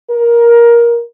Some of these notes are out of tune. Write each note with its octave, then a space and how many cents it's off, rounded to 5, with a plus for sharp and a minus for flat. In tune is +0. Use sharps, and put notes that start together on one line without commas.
A#4 +15